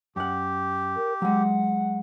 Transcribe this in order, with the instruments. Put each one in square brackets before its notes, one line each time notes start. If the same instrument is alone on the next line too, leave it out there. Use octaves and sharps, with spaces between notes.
[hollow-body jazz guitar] F#2 F#5 [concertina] G4
[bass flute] A#4
[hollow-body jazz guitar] F#3 G#3 [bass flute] F#5